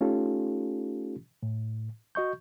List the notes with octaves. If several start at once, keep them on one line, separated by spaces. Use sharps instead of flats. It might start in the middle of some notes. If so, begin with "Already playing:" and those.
A3 C#4 D#4 F4 G4 A4
A2
F#4 D#5 C#6 G6